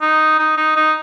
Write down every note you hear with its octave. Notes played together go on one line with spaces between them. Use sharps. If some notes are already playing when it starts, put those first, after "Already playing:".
D#4
D#4
D#4
D#4